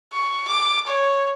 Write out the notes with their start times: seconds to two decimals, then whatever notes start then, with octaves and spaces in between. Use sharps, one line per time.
0.13 C#6
0.48 D6
0.87 C#5